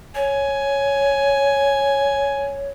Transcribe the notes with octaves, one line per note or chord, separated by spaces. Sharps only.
C#5 G#5